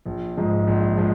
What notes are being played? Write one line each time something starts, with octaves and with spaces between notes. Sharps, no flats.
A#1
G#2 F3 G#3
A#1
F3 G#3